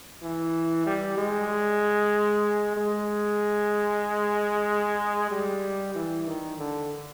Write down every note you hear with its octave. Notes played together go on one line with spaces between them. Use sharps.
E3
G3
G#3
G#3
G3
E3
D#3
D3